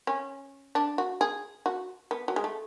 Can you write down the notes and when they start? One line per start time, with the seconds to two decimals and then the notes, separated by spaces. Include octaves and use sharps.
0.07 C#4
0.75 D4
0.98 F#4
1.21 G#4
1.66 F#4
2.11 B3
2.28 F#3
2.36 G#3
2.44 A3